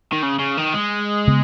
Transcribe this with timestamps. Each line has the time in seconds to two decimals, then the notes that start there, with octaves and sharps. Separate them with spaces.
0.13 D#3
0.23 C#3
0.39 C#3
0.58 D#3
0.74 G#3
1.27 C#3 B3